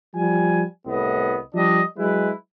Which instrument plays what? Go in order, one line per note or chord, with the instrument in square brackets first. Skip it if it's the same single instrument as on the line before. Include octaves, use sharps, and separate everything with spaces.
[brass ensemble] F3 G3 G#5
C2 A2 B3 D#5
F3 G3 D4 D#5
F#3 G#3 E4 B4